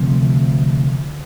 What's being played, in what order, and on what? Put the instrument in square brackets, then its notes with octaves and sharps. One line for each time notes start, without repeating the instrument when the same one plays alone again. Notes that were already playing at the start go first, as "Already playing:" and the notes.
Already playing: [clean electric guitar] D2 C3 F3